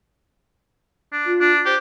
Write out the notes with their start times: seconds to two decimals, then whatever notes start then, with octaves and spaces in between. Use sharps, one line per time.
1.12 D4
1.25 F4
1.41 D4
1.65 G4 C5